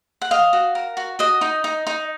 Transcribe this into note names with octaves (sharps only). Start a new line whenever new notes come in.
F#5
D#5 F5
F#4
A#4
F#4
F#4 D#5
D#4
D#4
D#4